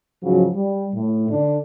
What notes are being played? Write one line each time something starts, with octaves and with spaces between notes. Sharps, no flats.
G#2 C#3 F3 F#3
G3
A2
D3 D4